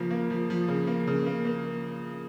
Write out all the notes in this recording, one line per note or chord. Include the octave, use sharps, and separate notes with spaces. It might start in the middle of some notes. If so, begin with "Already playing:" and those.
Already playing: C#3 F3 A#3
A#3
F3
F3
C#3
A#3
C#3
A#3
A#3